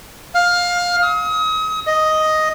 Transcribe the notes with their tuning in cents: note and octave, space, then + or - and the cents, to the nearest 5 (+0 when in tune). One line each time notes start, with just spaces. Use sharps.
F5 +20
D#6 +35
D#5 +5